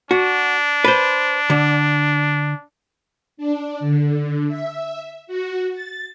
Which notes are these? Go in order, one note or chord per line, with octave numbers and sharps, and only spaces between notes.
D4 F#4
B4 C5
D3
D4
D3
E5
F#4
A6